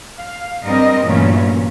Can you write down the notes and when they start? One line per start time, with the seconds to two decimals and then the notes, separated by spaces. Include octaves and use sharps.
0.20 F5
0.64 G2 G3 G#3 C4 A#4 D#5
1.04 G2 A#2 E3 F#3 A3 C#4